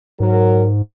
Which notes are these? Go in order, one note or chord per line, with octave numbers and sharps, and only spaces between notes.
G#2 F#3 A#4